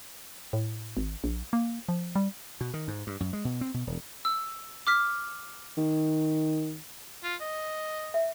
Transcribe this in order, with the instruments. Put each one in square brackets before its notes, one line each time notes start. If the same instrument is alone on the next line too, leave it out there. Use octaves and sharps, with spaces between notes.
[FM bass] A2
G#1
A#1
A#3
F3
G3
[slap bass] B2
D#3
G#2
G2
F#2
G#3
B2
C4
B2
E1
[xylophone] E6
D6 F6 B6
[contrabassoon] D#3
[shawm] F4
D#5
[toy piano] E5